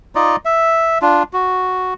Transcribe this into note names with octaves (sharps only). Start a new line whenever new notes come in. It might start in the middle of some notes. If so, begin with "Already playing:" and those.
D#4 F4 D5 D#5
E5
D4 F4
F#4